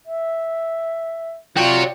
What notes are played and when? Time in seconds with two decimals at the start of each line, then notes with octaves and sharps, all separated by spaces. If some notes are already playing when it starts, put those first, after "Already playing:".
0.06 E5
1.57 C3 F4 F#4 C#5 D5 G5